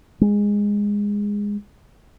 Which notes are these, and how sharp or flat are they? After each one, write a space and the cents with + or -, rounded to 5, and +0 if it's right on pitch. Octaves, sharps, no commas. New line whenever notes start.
G#3 -15